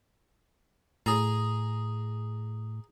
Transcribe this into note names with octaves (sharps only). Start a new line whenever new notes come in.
A2 G#4 A#5